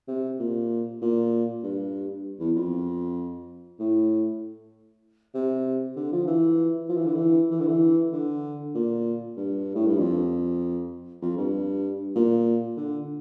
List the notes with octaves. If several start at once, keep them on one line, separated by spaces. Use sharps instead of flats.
C3
A#2
A#2
G2
E2
F2
A2
C3
D3
F3
E3
F3
E3
D3
E3
E3
D3
E3
D3
A#2
G2
A2
G2
F2
F2
G2
A#2
D3